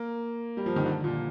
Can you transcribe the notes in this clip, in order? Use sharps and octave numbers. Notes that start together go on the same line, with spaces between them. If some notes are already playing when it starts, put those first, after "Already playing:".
Already playing: A#3
G3
F3
D#3
D3
A#2